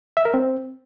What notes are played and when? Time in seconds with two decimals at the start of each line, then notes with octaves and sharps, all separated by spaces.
0.17 E5
0.25 A#4
0.34 C4